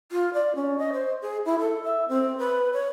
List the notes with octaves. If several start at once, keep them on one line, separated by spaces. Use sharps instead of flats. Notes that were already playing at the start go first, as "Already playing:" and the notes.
F4
D5
C#4
D#5
C5
G#4
E4
A4
E5
C4
B4
C#5